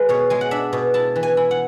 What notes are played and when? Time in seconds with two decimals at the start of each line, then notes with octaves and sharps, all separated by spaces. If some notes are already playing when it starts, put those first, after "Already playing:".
Already playing: G#3 B4
0.09 B2 C#5
0.30 G#3 G#5
0.41 F#5
0.51 D4 E5
0.73 B2
0.94 E4 A5
1.16 E3
1.23 G#5
1.37 E4
1.51 F#5